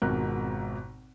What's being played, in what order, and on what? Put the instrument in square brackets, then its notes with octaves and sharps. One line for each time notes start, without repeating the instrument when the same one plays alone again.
[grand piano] G#1 F2 G#2 B2 A#4 F#6